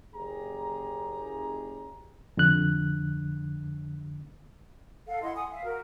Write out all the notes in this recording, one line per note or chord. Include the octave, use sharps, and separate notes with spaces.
F#1 G4 G#4 A#5
F2 D3 F#6
A4 F5 F#5
E4 D#5 F#5 C6
F#5 G#5 D#6
E5 F5
F#4 A#4